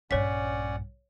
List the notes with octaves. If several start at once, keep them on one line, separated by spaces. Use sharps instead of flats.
A#1 G2 C#4 C#5 D5 F#5 B6